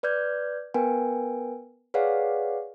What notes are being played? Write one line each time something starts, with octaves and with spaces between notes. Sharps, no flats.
B4 D5 F6 G6 G#6
B3 A#4 B4 G5 G#5
G#4 B4 C#5 D5 F5 F#5